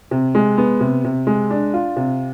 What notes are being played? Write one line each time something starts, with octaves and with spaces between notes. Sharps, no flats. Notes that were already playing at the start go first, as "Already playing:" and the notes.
C3
G#3
B3
C3
C3
G#3
D4
F4
C3